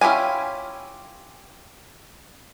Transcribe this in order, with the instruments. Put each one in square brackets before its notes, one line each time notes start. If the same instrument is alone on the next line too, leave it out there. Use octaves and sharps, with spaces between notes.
[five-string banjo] C#4 E4 F4 G4 G#5